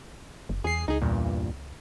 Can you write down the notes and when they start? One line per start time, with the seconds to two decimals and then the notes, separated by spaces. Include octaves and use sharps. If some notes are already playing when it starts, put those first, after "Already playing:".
0.49 F#1
0.64 E2 G#4 C7
0.88 C#2 D#4 G#4
1.01 E2 G2 A#2